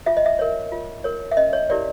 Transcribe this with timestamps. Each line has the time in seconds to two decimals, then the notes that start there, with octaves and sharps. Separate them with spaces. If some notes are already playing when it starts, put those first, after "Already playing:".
0.06 F4 E5
0.17 D#5
0.26 E5
0.39 A#4 C#5
0.72 F4
1.04 A#4 C#5
1.31 E5
1.37 C#4 D#5
1.53 C#5
1.69 E4 G4 A#4 C#5 D5